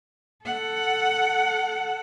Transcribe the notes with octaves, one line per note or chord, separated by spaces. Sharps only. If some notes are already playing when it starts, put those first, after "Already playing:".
A4 F#5